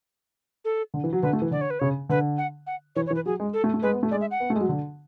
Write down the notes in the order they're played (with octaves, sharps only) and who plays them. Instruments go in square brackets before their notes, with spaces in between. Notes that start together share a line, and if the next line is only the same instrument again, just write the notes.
[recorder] A4
[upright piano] D3
E3
F#3
[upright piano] D3 [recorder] B4
[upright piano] A3
E3
[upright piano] D3 [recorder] D5
[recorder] C#5
B4
[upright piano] C#3 [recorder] C#5
[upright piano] D3 [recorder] B4
[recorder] F#5
F#5
[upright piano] E3 [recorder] C#5
[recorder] C#5
[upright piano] E3
[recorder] B4
[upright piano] F#3 [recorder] G#4
[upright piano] G#3
[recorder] A4
[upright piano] A3
A3
[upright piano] G#3 [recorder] B4
[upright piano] B3
A3
[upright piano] G#3 [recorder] D5
[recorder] E5
F#5
[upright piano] B3
A3
G#3
F#3
D3